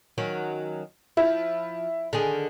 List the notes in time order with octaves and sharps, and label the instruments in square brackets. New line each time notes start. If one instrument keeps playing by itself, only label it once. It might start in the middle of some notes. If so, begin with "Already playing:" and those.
[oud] D#3 F#3 C#4
[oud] F3 [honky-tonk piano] E4
[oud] D3 D#3 G#4